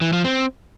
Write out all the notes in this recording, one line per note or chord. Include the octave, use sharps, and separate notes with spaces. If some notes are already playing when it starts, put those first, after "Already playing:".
E3
F3
C4